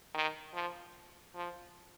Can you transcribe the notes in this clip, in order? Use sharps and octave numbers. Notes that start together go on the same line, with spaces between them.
D#3
F3
F3